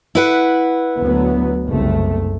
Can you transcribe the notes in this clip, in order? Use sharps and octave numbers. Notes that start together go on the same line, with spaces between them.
E4 B4 F#5
D2 F#3 B3
F#1 C2 A3